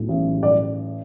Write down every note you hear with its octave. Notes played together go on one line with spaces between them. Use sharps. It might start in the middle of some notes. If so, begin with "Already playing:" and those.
Already playing: B1 A2
A1
D5